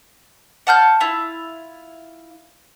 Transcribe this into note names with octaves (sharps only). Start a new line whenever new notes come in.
F#5 A5 F6 G6
E4 F4